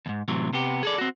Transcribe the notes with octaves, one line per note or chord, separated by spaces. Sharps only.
D#2 G#2
A2 C3 E3 F#3
C3 B3 G4
G#4 A4 D5
C4 F#4